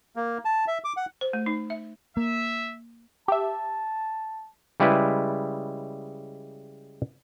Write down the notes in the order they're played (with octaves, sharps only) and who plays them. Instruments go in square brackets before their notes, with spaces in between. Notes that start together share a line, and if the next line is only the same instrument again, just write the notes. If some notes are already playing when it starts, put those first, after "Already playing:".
[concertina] A#3
A5
E5
D6
F#5
[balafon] C5
A3
D#4
E5
[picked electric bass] A#3 [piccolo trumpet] E5
[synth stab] G4 E5 [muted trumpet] A5
[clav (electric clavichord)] C#3 G3 G#3 E4 B4